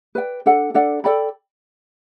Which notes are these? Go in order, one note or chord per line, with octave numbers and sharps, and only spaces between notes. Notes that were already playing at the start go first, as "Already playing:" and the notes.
B4 D5 G5
D4 A4 D5 F#5
D4 A4 D5 F#5
A4 D5 G5 B5